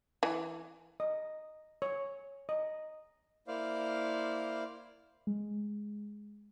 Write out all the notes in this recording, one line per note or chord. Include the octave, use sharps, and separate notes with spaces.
E3
D#5
C#5
D#5
A#3 E4 C5 D5 F5
G#3